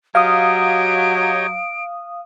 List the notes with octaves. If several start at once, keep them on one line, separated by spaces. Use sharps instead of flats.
F#3 G4 C#5 D#5 F5 D#6 D7